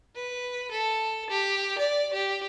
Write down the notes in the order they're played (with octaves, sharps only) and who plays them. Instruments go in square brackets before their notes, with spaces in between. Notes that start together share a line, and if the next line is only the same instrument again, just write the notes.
[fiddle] B4
A4
G4
D5
G4